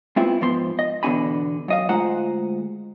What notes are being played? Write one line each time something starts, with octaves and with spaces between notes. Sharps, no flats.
G#3 B3 C4 E4 F4
G#2 F3 B3 C6
D#5
E2 B2 D3 D#4 G#5 B5
F#2 D#5 F5
D2 G#3 F4 C5 F#5 A#5